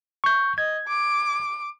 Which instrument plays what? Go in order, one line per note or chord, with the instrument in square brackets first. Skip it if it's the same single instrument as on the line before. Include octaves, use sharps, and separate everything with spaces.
[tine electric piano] C#6 G6
[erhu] D#5 [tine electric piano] G#6
[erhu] D6